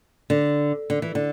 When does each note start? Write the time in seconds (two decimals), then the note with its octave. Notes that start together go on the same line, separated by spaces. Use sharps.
0.30 D3
0.90 D3
1.02 E3
1.15 D3